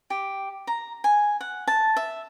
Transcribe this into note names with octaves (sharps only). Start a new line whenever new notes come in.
G4
A#5
G#5
F#5
A5
E5